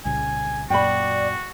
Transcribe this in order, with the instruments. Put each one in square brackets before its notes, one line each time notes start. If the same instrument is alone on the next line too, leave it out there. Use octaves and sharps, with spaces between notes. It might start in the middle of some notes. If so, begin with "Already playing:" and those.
[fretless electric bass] C2 A#2 C#3 [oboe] G#5
[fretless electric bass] F#2 A#2 [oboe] F#4 [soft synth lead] D5 [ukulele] G5 B5